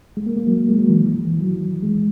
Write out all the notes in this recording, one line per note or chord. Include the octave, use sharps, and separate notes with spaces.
G#3
A#3
A#3
F#3
G#3
F#3
E3
D#3
E3
F#3
G#3